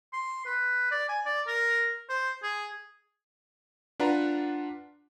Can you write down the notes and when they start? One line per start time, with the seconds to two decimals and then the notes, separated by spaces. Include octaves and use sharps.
0.13 C6
0.46 B4
0.91 D5
1.09 G#5
1.25 D5
1.47 A#4
2.09 C5
2.43 G#4
4.00 D4 F4 B4 F#5 A#5